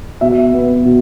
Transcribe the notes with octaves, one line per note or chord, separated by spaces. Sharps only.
B2 E5
B3
B2